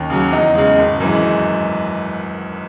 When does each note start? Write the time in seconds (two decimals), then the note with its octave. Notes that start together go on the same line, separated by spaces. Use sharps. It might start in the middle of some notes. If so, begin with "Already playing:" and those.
Already playing: D#2 C#4
0.10 C#3 F#3
0.32 E2 D#4
0.55 C#3 G#3
0.78 G#1
1.00 F#2 E3 G#3